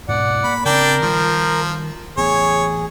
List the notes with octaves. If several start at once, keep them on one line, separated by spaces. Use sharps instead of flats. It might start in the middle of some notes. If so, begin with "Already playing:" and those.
G#2 B2 D5 F#5
A#3 B5
C#3 C4 D4 A#4 D5 G5
D#3 F3 G3
A1 B3 G#4 C#5